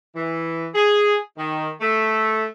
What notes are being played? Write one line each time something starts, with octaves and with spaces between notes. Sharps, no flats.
E3
G#4
D#3
A3